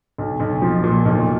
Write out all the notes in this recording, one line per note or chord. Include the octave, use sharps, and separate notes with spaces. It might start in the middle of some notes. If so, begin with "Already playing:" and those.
B1
B1
F3
A#2
B1